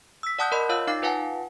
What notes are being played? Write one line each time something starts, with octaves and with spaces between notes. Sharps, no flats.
E6 B6
D5 F#5 A5 D#6 F#6 G6
A#4 D5 D#5 B5 C6
F4 C#5 F5 E6 G6
D#4 F5 D6 C7
F4 B4 F5 F#5 G#5 A5